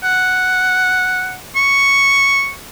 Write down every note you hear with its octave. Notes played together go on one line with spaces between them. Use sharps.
F#5
C#6